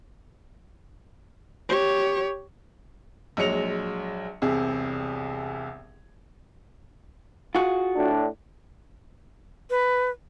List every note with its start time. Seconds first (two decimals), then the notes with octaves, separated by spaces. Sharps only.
1.69 G4 C#5
3.37 A#1 F#3 G#3 C#7 F7
4.42 E1 C2 C3 G#4
7.55 F4 F#4 G#4
7.96 A2 D4
9.70 B4